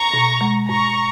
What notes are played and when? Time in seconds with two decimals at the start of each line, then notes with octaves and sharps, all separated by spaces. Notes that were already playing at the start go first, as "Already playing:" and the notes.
Already playing: A#5 C#6
0.14 B2
0.41 G#3
0.69 G#2 A#5 C#6